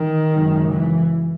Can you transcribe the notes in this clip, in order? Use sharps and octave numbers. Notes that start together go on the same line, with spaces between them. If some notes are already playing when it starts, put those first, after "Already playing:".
Already playing: D#3
G#1 F#2 C#3
E3